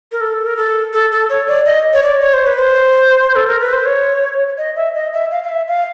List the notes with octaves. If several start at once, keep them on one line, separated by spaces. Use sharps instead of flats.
A#4
A4
A#4
A4
A4
A4
C#5
D5
D#5
C#5
D5
C#5
C5
B4
C5
A4
A#4
B4
C5
C#5
D#5
E5
D#5
E5
F5
F5
E5
F5